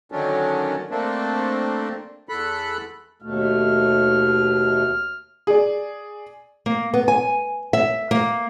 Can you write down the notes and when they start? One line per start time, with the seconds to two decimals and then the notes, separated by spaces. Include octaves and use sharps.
0.12 D3 D#3 F#3 C#4 D4
0.91 A3 A#3 C4 D4
2.29 E2 A4 B5 F#6
3.22 D#2 B2 A3 F6
5.47 G#4 D5
6.66 A#3
6.94 B3
7.08 G#5
7.73 E5
8.11 A#3